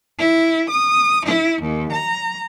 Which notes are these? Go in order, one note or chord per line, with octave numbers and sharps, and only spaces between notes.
E4
D#6
E4
D#2
A#5